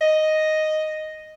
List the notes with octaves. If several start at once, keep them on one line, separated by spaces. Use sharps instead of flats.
D#5